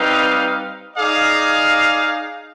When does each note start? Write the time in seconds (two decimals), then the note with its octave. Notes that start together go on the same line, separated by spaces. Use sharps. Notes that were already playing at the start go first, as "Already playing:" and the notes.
Already playing: G3 C4 D#4 B4 F5
0.96 D#4 G#4 D5 F5